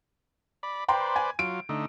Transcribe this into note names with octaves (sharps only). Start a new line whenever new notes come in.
D5 B5
B4 C5 D5 G5 A#5 C6
G#5
F#3 F4 D7
D3 A3 D#4